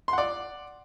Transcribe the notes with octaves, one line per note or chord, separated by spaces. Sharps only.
D5 F#5 C6